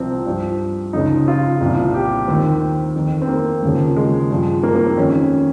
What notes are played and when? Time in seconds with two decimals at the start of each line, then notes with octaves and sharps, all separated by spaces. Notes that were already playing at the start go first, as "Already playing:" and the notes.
Already playing: C2 C3 F3 C4
0.26 G2 F3
0.93 C#2 C#3 F3 D#4
1.28 F4
1.61 C2 A#2 F3
1.94 G4
2.28 D#2 D#3 C4
2.96 F2 D#3
3.22 C4
3.28 A#3
3.62 D#2 C#3 F3
3.96 G#3
4.31 G2 F3
4.63 A#3
4.75 A#3
4.86 C4
4.97 F2 D#3 C#4